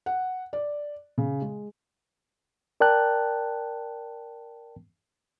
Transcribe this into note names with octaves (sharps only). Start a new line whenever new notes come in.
F#5
D5
C#3
G#3
A#4 D5 G5 A5 F#6